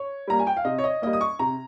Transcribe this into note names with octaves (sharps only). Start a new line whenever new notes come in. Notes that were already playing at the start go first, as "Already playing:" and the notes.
Already playing: C#5
G3 A#3 A#5
G#5
G5
F5
C3 D#5
C#5
D#5
G3 A#3 D#5
D#6
C#6
C3 A#5